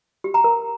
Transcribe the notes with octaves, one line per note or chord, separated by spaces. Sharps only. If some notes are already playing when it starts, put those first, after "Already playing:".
G4
A#5
A#4